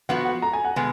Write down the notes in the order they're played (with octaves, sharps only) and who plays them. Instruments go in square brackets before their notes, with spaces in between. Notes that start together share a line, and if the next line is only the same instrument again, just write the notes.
[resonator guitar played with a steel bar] F3 B3 F#4 [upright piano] F#5
[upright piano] F#5
A#5
G#5
F#5
[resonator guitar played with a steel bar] B2 G#3 B3 [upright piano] G#5